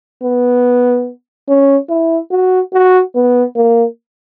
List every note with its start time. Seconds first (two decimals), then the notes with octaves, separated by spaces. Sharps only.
0.23 B3
1.49 C#4
1.89 E4
2.31 F#4
2.73 F#4
3.15 B3
3.56 A#3